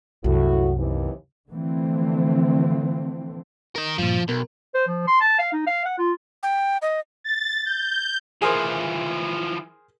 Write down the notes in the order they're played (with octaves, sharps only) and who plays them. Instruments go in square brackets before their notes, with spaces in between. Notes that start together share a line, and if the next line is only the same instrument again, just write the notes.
[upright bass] C2 F#2 [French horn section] A2 F#4
[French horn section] D#2 C3 E3
[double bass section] D3 E3 F3 A3 C4
[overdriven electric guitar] A#4 D#5
[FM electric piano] G2 A#2 [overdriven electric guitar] F3
[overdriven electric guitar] B1 [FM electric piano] B3 A#4
[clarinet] C5
F3
C6
A5
F5
D#4
F5
F#5
F4
[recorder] G5
D#5
[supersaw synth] A6
G6
[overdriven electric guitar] E3 F3 [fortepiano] G#4 A#4 C5